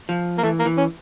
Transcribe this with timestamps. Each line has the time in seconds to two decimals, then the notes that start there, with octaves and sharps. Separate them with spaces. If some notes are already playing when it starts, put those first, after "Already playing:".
0.09 F3
0.38 A#3
0.43 E3 A3
0.59 A#3
0.66 E3
0.77 C#4